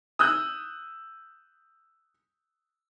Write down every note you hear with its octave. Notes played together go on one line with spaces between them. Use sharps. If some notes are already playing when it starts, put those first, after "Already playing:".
D#6 E6 F#6 G6